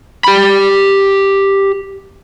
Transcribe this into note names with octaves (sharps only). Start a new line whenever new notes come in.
G4 B5